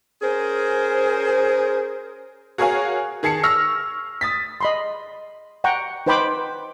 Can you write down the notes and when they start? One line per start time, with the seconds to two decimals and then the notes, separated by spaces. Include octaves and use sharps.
0.22 C#4 G#4 A#4 C5
2.58 F#4 G#4 A#4 C#5 F5 G#5
3.23 D#3 G#4 A5 C7 C#7
3.43 C#6 E6 F6 A#6
4.21 D#6 A6 B6
4.61 D#5 B5 C6
5.64 F#5 G5 A#5 C#6
6.06 D#4 B4 C5 G5 B5 D6